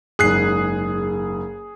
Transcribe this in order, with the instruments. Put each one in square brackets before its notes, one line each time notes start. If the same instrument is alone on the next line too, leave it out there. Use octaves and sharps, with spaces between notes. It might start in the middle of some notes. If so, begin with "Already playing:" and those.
[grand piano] F#1 G#2 [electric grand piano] G#4 F#6 C7